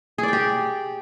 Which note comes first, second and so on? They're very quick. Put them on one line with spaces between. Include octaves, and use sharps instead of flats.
G#4 D5 G5 G4